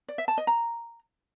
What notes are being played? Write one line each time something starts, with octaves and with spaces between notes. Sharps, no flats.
D5
E5
A5
D#5
A#5